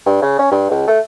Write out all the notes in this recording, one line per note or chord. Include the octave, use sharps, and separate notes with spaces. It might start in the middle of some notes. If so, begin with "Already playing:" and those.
G2
C#3
C#4
G2
C#2
A3